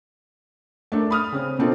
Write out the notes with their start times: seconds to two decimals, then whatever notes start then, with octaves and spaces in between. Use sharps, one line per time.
0.92 A3 D4 A4 A#4
1.10 B5 D#6 F6
1.33 C#3 C4 C#4
1.59 B2 A#3 C4 D4 F4 A4